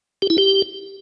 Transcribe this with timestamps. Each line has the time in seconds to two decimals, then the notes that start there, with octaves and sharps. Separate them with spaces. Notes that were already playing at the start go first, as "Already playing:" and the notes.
0.22 G4
0.30 E4
0.38 G4